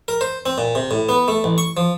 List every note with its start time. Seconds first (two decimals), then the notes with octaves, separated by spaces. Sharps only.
0.08 A#4
0.21 C5
0.46 C4
0.58 A#2
0.75 C3
0.91 A2
1.09 B3
1.28 A3
1.44 A1
1.58 C#6
1.77 F3